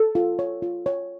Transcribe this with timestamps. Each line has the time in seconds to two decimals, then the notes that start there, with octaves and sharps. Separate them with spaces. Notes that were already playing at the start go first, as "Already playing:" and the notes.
Already playing: A4
0.15 F4
0.39 C#5
0.62 F4
0.86 C#5